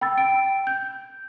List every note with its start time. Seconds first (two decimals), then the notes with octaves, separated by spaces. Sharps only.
0.01 G5 B5 E6 A6
0.18 G5 D7
0.67 G6